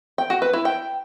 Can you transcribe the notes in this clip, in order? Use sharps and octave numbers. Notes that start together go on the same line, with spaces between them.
G5
F#4
B4
E4
G5